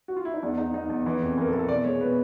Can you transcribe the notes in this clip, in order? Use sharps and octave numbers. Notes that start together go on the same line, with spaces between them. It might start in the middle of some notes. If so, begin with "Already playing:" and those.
F#4
F4
E4
D#4
E2 D4
E2 D#4
E2 D#4
E2
E3
F2
E3 A#4
A4
E3
A4
B2 D5
G#3 C#5
B2 B4